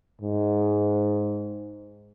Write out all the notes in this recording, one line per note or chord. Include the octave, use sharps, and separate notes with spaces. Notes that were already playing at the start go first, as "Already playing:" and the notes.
G#2